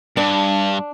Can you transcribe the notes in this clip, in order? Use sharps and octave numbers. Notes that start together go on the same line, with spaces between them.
G2 D4